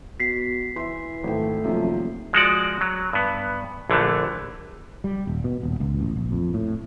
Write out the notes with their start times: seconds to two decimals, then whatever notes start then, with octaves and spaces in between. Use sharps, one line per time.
0.20 B2 B6 C7
0.76 E3 E5 C6
1.24 G#1 A3 G5
1.64 D#1 F#2 C3 F3
2.33 F3 G#3 F#4 D5
2.81 F#3
3.13 G2 B3
3.90 A#1 D3 E3 A3
5.04 G3
5.27 D#1
5.44 B2
5.63 D#1
5.80 C#2
6.01 A1
6.16 A#1
6.32 F2
6.54 A2